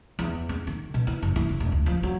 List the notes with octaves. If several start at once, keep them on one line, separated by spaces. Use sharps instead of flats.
E2
C4
D#3
B2
E3
F#1
E3
F#1
E1
D2
F3
F#3